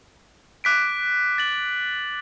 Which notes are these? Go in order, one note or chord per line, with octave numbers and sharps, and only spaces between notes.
D6 F#6 B6 D7
A6 F#7